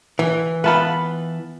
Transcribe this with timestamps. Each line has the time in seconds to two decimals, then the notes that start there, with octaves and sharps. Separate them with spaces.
0.19 E3
0.64 B3 F4 B4 E5 A5 B5